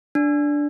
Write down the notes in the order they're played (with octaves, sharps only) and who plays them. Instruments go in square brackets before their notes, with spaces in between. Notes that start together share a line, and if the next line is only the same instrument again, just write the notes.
[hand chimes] D4